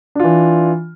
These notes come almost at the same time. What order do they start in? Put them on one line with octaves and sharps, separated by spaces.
D4 F4 E3